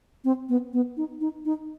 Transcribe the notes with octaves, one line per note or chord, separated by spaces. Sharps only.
C4
B3
B3
D#4
D#4
D#4